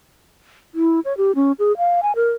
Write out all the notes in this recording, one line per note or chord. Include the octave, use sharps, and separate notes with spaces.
E4
C#5
G4
C#4
G#4
F5
G#5
A#4